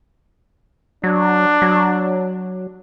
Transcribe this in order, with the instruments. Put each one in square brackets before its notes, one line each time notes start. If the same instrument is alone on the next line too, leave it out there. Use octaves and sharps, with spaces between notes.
[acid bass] F#3 [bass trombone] D4
[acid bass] F#3